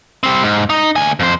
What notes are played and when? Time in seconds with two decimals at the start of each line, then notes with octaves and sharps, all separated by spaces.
0.23 G3 C4
0.43 G#2
0.70 D#4
0.96 D2 G#5
1.20 F2 C5